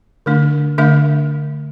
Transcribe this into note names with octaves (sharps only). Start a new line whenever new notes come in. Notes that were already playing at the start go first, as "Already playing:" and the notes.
D3 A3 D4
D3 A3 D4 E5